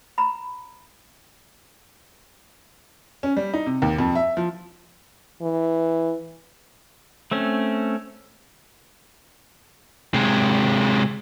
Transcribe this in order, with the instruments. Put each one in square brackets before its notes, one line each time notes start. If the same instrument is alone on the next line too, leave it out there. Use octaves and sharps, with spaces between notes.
[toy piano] A#5 B5
[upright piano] C#4
G3
D#4
C3
D#2
F2
E5
F3
[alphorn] E3
[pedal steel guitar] A3 C4 C#4
[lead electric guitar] C3 G#3